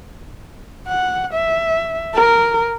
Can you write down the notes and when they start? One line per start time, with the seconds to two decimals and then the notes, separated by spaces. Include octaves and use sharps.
0.87 F#5
1.34 E5
2.15 A#4